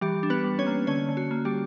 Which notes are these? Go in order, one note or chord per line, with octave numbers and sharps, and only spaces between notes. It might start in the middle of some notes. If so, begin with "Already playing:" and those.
E3 G3 G4
D4
B3 B4
G3
C#4 C#5
A#3
D3 C#4 C#5
D3
F#4
A#3
G3 G4